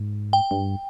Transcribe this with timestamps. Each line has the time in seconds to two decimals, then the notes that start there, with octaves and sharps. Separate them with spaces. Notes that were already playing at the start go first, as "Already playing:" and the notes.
Already playing: G#2
0.33 G5
0.51 G2